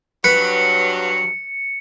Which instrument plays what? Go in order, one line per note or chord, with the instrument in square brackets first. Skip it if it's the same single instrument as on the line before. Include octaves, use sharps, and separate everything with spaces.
[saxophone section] G2 F#3 [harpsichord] B4 [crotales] C#7